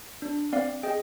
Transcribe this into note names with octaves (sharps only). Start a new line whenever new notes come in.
D4
C4 D5 F5
G#4 D#5 G5